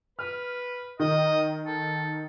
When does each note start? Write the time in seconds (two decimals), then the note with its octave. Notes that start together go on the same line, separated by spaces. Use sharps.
0.19 B4 F6
1.00 D#3 D#5
1.66 A4